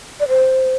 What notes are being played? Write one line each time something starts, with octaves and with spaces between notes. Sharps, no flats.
D5
C5